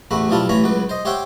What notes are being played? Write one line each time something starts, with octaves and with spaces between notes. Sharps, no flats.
A1 E2 A3 F#4 B5
B1 F3 G3 E4 F4 A5
A1 E3 C#5 A#5 B5 C#6
C#2 F#3 B4
C5 D#5
G4 C5 C#5 E5 F#5 G5